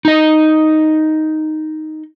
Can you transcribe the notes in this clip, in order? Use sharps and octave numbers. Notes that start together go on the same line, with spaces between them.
D#4 D#5